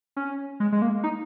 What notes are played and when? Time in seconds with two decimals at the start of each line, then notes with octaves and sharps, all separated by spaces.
0.16 C#4
0.60 G#3
0.72 G#3
0.82 A#3
1.03 D#4